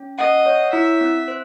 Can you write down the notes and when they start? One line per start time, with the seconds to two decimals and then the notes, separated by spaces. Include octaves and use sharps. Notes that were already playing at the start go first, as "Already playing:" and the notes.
Already playing: C#4
0.18 D#5 F#5
0.46 C#5
0.72 E4 E5
1.01 C4
1.28 C5